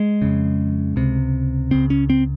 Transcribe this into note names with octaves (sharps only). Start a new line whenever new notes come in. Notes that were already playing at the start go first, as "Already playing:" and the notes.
Already playing: G#3
F2 C#3
C#2 C3
C#2 C#3 C4
C#4
C4